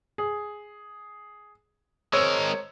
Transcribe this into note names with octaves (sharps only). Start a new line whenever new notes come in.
G#4
G#3 A#4 C5 C#5 E6